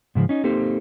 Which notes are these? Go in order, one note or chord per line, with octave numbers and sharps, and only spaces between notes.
G#2 C#3 E3 F3
C#4 D#4
A#3 C4 D#4 G4 A4 C5